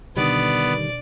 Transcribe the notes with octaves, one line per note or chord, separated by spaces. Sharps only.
B2 D3 D#3 G3 B3 D4 D5 D#6